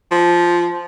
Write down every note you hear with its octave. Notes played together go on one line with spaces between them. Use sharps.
F3